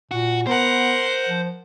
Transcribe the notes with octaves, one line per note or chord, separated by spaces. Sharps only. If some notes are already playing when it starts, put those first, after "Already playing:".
A#2 F#4
B3 A#4 C5 F#5
F3